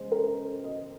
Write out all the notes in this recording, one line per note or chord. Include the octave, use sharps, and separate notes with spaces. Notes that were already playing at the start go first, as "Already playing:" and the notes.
Already playing: C#3 G#3 C5
A#4
D#5